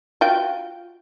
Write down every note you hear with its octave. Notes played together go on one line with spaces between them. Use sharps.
F4 F#4 G5